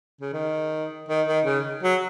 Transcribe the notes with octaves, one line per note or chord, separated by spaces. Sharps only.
C#3
D#3
D#3
D#3
C#3
F#3